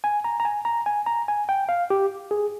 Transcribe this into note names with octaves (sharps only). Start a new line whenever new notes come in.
G#5
A#5
A#5
G#5
A#5
G#5
A#5
G#5
G5
F5
G4
G#4